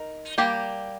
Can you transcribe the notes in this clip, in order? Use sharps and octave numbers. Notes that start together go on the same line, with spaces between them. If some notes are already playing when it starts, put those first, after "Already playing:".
Already playing: D#4 A#4
G3 A#3 G4